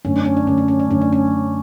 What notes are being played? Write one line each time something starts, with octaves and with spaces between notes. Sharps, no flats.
F#2 D3 A3 C#4
D4
C#4
D4
F#2 D3 A3 C#4
D4
C#4
D4
F#2 D3 A3 C#4
D4
C#4